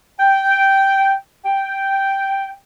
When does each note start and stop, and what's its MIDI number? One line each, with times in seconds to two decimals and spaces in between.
0.20 1.15 79
1.46 2.53 79